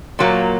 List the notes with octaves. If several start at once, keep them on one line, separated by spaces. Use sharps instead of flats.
A#2 F#3 A#3